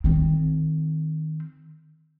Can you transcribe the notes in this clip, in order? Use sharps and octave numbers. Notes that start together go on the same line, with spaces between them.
D#3 C4